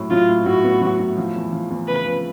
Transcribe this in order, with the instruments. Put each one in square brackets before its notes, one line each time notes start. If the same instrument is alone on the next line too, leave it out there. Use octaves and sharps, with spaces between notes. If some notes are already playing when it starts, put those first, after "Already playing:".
Already playing: [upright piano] A2 F#3
[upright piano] F#3 [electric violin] F4
[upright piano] A2
[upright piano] A2 [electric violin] F#4
[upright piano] B3
F#3
A2
F3
E2
F3
E2
[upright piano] C#3 [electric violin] B4
[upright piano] F3